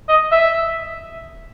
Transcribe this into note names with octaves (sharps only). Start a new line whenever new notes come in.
D#5
E5